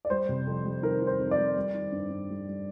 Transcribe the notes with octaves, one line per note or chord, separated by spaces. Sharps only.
D5
G3 C5
C3
F2
G3
D#3 A#4
D#3 C5
F2
D5
G3
G3
D#3
G2
G2
G3
G3